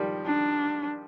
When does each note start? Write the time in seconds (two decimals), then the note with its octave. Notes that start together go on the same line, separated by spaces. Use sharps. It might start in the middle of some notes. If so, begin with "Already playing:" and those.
Already playing: D#3 F3 G3
0.26 D4